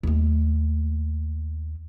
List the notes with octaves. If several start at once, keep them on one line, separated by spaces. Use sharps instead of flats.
D#2 A3